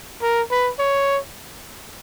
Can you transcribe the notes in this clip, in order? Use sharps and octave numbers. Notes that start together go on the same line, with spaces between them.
A#4
B4
C#5